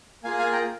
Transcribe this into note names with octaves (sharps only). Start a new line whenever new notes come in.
A#3 F4 G#4 F5 G#5
F5 G#5
G5 A#5